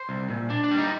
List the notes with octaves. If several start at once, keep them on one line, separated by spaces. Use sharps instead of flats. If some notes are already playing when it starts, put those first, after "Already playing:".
Already playing: C5
C2
A#2
D4
D4
G3
D#4